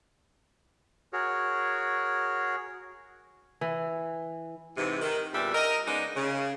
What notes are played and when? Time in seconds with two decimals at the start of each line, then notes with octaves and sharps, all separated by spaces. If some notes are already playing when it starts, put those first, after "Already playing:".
1.13 F#4 G#4 A#4 C#5
3.61 E3
4.77 G#2 C3 E3
5.01 D#3
5.33 E2 A#2 G3 D4 G4 E5
5.54 A#4 D#5
5.87 C#3 G#3 B3 D4 D#4
6.16 C#3